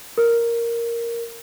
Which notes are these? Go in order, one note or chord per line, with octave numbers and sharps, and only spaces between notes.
A#4